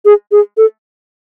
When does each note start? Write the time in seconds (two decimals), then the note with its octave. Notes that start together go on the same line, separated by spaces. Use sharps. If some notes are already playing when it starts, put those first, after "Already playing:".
0.05 G#4
0.32 G#4
0.57 A4